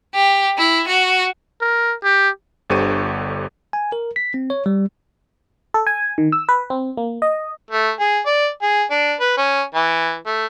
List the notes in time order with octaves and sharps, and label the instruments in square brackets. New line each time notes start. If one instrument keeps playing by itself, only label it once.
[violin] G4
E4
F#4
[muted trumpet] A#4
G4
[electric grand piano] G1 D3 G4 C5 C#6 D#7
[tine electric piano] G#5
A#4
B6
C4
C#5
G3
[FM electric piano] A4
G#5
D#3
E6
B4
C4
A#3
D#5
[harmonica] A3
G#4
D5
G#4
D4
B4
C#4
E3
A3